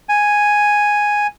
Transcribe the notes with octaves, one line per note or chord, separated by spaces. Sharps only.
G#5